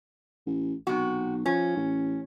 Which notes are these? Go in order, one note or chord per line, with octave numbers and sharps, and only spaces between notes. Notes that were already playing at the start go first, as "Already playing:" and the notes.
A1
B1 C3 F#4
F3 C#4
A1